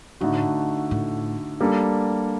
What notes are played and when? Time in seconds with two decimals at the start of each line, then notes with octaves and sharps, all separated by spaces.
0.21 A2 D3 A3 D#4 F#4
0.91 A2
1.60 G3 A#3 D4 A4